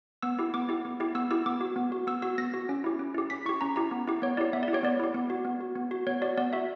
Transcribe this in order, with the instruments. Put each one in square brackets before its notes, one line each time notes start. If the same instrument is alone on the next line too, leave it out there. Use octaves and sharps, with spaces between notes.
[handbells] B3 E6
E4 G4
B3 D6
E4 G4
B3
E4 G4
B3 E6
E4 G4 E6
B3 D6
F#4
B3
F#4
B3 E6
F#4 E6
B3 A#6
F#4
C#4
E4 G4
C#4
E4 G4
C#4 B6
E4 G4 C#6
C#4 A#5
E4 G4 A#5
B3
E4 G4
B3 C#5
E4 G4 D5
B3 E5
D5
E4
G4 C#5
B3 D5
E4 G4
B3
F#4
B3
F#4
B3
F#4
B3 C#5
F#4 D5
B3 D5
F#4 E5